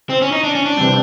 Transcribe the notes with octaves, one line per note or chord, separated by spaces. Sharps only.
C4
C#4
D#4
D4
C#4
D4
C3 E3 G3 C4